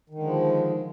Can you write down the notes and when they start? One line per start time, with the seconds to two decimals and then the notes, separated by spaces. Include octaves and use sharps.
0.10 D#3
0.14 D3
0.19 G#3
0.23 F3